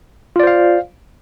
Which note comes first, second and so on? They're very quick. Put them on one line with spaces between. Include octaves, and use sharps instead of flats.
F4 D5 C5 F5